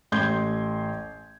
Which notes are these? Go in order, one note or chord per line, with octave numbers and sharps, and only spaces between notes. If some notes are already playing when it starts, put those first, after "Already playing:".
A1 C6 G6 G#6